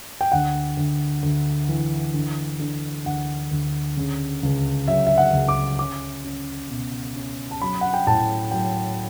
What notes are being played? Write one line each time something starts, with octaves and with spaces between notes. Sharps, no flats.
G5
D2 F#5
D2
D2
E3
D3
D3
D2 F#5
D2
C#3
C#2
F#3 E5
E5
F#5
C#2
D6
C#4 D6
C#4
B2
C#4
A5
F#3 B5
F#5
G5
A2 A5
F#3 G5